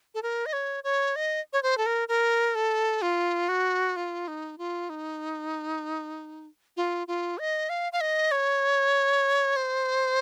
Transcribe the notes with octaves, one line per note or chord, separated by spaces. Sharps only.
A4
A#4
D#5
C#5
C#5
D#5
C#5
C5
A4
A#4
A#4
A4
F4
F#4
F4
D#4
F4
D#4
F4
F4
D#5
F5
F5
D#5
C#5
C5